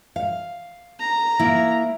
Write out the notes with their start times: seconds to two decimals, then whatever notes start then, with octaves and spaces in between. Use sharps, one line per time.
0.16 F5
0.99 A#5
1.39 A#3 E4